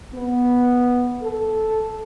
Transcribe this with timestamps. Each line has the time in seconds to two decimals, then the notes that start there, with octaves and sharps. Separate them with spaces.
0.14 B3
1.22 A4